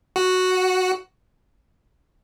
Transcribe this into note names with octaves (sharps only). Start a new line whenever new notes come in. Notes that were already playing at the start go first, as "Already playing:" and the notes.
F#4